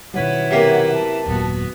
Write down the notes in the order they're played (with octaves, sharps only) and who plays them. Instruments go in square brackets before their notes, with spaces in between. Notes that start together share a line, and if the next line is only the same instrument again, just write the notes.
[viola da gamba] F#2 E4 B4 [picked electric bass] B2 D#3 G3 [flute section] C#5 F#5
[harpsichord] C3 A#3
[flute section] A5
[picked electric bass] D#1 F#2 A#2 [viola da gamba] B3 F#4